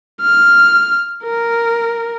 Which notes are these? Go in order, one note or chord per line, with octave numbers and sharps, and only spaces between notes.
F6
A#4